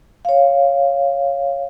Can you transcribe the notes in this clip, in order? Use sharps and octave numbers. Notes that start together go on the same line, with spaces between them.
C#5 F5